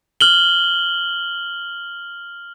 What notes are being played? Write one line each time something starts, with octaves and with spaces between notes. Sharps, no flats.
F6 F#7 G7